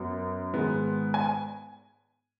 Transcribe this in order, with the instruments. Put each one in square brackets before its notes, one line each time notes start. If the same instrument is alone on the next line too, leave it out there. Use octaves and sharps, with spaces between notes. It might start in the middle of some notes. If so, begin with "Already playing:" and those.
Already playing: [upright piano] F#2 F#3 B3
G#2 D#3 G#3 B3
G#5